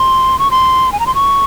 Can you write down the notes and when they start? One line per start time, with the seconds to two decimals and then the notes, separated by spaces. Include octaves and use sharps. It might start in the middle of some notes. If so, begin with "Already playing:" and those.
Already playing: C6
0.39 C#6
0.51 C6
0.92 G#5
1.00 A#5
1.07 C6
1.15 C#6